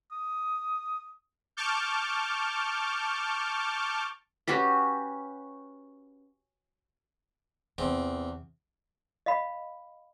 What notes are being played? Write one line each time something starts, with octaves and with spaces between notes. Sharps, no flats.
D#6
A5 C#6 D6 F6 G6
C#4 F#4 G4 B4
E2 C3 E3 C4
D#5 F5 B5